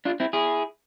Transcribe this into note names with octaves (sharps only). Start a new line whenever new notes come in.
D4 F4
C4 E4
E4 G#4